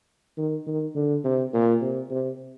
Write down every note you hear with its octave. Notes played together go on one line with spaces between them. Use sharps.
D#3
D#3
D3
C3
A#2
C3
C3